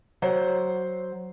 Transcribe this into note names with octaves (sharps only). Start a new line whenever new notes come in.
F#3 C5 F#5